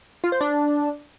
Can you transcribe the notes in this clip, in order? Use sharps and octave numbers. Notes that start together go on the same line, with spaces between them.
F4
C5
D4